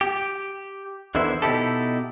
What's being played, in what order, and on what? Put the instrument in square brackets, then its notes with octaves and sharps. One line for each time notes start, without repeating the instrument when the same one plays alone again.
[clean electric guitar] G4
E2 D3 D#3 E4 C5 E5
B2 D#4 E4 G4 A4